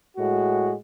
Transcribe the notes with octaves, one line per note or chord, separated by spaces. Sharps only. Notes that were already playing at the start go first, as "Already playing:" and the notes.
A2 G#3 F#4